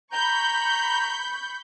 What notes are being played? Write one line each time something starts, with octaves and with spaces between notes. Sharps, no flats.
A#5 B5 C#6 G6